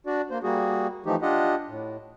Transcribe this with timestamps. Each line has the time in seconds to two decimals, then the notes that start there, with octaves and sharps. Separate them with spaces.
0.06 D4 F#4 D5
0.31 A#3 C5
0.43 G3 A#3 F#4 G#4
1.06 E3 F3 A3 D#4 G4
1.22 D4 F4 G4 D#5 F#5
1.68 A2